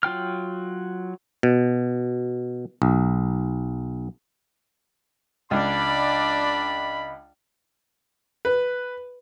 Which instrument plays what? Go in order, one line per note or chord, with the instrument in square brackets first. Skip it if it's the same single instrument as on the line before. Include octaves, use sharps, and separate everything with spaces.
[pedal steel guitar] F#3 F4 G5 F6
[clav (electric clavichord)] B2
B1
[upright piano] C#2 [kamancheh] D4 D5 [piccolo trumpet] B5
[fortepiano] B4